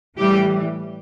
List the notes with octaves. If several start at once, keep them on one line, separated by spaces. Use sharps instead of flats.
A2 E3 G3 G4